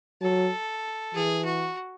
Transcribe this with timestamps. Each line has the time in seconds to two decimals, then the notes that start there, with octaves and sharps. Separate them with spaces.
0.22 F#3 A4
1.14 E3 G#4
1.45 F#4